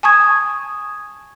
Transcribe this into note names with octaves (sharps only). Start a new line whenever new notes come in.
G#5 A5 C#6 D#6 G#6